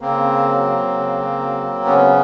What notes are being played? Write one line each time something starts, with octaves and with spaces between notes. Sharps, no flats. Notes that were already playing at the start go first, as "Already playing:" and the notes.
C#3 A#3 C4
F#3
C#3
F#3
C#3 B3 C#4